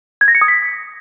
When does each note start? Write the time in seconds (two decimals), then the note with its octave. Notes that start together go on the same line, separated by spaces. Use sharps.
0.21 G#6
0.28 A#6
0.35 C#7
0.41 D#6
0.48 B6